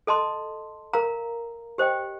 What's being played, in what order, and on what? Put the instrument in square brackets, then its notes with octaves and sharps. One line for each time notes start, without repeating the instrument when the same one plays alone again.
[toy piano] A4 D#5 A5 C6
A#4 F5 A#5
G4 C5 D#5 G5